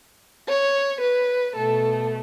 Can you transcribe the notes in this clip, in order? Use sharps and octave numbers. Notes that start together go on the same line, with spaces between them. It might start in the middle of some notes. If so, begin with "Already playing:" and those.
C#5
B4
B2 A3 A4